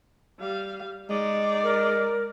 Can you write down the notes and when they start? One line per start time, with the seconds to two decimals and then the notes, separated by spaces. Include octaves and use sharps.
0.40 G3 F5
1.10 G#3 D#4 D5
1.63 A#4